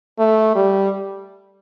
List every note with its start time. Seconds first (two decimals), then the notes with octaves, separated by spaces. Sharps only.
0.19 A3
0.55 G3